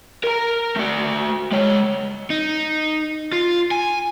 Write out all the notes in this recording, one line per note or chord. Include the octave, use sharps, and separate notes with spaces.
A#4 A#5
A3 F#4
G#3 C#5
D#4
F4
G#5